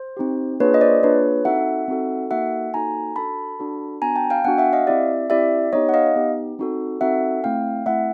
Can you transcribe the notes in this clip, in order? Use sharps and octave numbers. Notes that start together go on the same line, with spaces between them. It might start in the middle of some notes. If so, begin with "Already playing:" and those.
Already playing: C5
C4 D#4 G4
A#3 D4 F4 G#4 B4 C#5
D#5
C5 D5
A#3 D4 F4 G#4 B4 C#5
C4 D#4 F#4 A4 E5 F#5
C4 D#4 F#4 A4
A#3 D#4 F#4 A4 E5 F#5
A#3 D#4 F#4 A4 G#5 A#5
D4 F#4 A4 A5 B5
D4 F#4 A4
B3 D4 F#4 G#5 A#5
G5 A5
F5 G5
B3 D4 F#4 F#5 G#5
E5 F#5
D#5 F5
C4 E4 G4 D5 E5
C4 E4 G4 D5 E5
B3 D#4 G4 C#5 D#5
F#5
D#5 F5
B3 D#4 G4
C4 D#4 F#4 A4
C4 D#4 F#4 A4 E5 F#5
A3 C4 E4 F5 G5
A3 C4 E4 E5 F#5